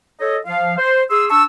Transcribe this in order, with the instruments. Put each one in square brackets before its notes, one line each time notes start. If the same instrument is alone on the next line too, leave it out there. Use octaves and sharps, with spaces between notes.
[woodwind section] A4 C#5 D#5
F3 F5
C5
G#4 C6 E6
D4 A5 C#6 E6